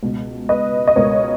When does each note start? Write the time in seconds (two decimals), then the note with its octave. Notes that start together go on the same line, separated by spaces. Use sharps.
0.03 C#2 B2
0.49 B4 D#5
0.88 D#5
0.96 C#2 B2 A#4 C#5